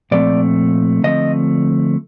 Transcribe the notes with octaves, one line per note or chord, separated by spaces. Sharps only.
A#2 F3 A3 C4 D5
D3 F3 A3 C4 D#5